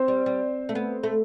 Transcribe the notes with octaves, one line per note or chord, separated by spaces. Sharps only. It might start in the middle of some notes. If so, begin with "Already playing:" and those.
Already playing: C4 C5
G3
G3
A3
B3
A3